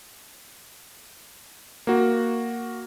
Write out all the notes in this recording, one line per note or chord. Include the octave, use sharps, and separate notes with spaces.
A#3 F#4